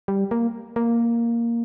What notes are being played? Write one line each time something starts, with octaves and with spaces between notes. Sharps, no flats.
G3
A#3
A#3